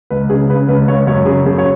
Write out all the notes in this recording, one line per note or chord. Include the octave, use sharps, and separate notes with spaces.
C#2 B4
C#3 G#4
C#3 B4
C#2 B4
C#2 C#5
F#2 C#5
C#3 G#4
F#2 G#4
C#5